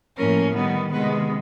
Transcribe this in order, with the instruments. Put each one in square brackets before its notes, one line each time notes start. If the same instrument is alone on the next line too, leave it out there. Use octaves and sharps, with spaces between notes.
[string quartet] A2 F3 A#3 C#4 A#4
D#3 G3 B3
C3 D#3 G#3 B3 B4